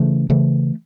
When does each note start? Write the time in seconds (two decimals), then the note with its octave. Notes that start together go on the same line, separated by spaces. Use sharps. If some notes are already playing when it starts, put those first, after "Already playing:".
Already playing: C#3 E3 A3
0.30 C#3 E3 A3